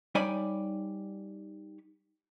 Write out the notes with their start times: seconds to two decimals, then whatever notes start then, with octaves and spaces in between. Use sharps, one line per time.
0.15 G3 D#4 C#5 D5 G#5 B5